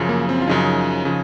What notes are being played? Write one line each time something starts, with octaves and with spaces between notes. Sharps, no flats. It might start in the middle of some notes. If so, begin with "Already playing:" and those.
Already playing: F#2 C#3 F3
A#3
C4
F4
F#2 C#3 F3 D#4
C#3 F3